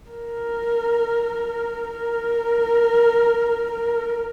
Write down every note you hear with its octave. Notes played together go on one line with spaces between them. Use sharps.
A#4
A#4
A#4